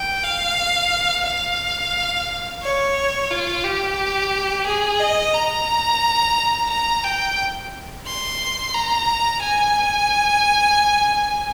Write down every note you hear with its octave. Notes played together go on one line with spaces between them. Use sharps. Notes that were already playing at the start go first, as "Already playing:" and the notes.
Already playing: G5
F5
F5
C#5
F4
G4
G#4
D#5
A#5
A#5
G5
C6
A#5
G#5